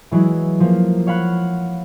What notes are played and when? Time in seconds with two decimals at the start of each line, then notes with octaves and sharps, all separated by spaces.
0.11 E3 F#3 G#3 E4
0.60 F3 A#3
1.07 C#5 F5 F#5 B5 F#6